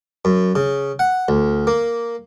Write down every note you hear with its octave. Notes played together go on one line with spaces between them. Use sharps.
F#2
C#3
F#5
D2
A#3